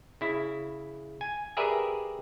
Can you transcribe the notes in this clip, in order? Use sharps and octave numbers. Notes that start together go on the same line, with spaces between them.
C#3 E4
G#5
G4 G#4 A#4 B4 D5 E5